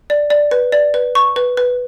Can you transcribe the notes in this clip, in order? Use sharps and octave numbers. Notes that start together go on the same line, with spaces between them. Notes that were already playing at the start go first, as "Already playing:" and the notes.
D5
D5
B4
D5
B4
C#6
B4
B4